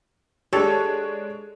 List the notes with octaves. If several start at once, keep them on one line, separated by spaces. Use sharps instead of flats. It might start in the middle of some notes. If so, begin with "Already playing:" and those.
G#3 D4 G4 A4 C#5